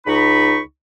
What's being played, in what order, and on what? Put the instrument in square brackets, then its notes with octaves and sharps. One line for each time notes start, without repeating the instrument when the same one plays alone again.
[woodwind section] C#2 D#4 B5 C#6